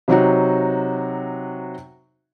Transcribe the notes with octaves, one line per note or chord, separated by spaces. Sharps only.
C3 F#3 D#4 F#4